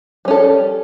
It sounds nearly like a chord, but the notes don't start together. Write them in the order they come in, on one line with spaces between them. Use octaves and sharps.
G3 C#4 A4